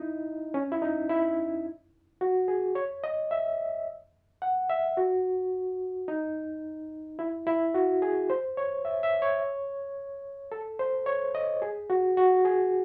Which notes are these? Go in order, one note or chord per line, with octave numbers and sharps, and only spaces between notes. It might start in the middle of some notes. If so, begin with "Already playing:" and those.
Already playing: D#4 E4 D#5
C#4
E4
D#4
E4
F#4
G#4
C#5
D#5
E5
F#5
E5
F#4
D#4
E4
E4
F#4
G#4
C5
C#5
E5
E5
C#5
A4
C5
C#5
D#5
G#4
F#4
F#4
G#4